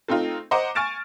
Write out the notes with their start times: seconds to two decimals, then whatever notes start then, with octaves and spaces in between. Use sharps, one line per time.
0.08 A3 C4 D#4 F4
0.51 C5 D#5 F#5 A#5 D6
0.75 G#5 C#6 F6 A6 D7 E7